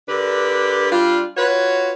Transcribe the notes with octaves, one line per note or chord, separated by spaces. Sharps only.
D3 D4 G4 A#4 B4
G3 D4 F4
F4 F#4 B4 C#5